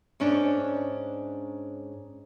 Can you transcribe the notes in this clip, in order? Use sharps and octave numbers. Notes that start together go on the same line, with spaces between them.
G#2 C#4 D4